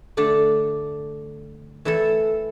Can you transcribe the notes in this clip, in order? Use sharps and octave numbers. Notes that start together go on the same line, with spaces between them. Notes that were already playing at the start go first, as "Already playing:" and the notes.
D3 A3 D4
E3 A3 E4 A4